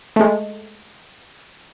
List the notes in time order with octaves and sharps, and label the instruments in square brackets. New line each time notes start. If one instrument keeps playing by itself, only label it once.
[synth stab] G#3 A3